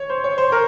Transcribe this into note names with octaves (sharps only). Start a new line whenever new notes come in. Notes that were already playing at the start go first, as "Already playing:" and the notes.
Already playing: C#5
C5
C#5
C5
A#4